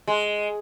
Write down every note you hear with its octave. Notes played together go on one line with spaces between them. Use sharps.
G#3